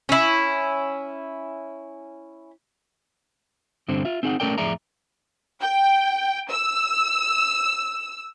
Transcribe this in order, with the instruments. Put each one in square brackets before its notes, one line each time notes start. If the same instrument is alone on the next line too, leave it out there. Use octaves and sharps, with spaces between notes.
[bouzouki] C#4 E4
[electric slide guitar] G2 D3 C4 C5
F4 E5
C4 D#4 G#4 F5 F#5
A3 C#4 A4 A#4 D5 G5
F2 A2 G#4 D5 E5 A#5
[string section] G5
E6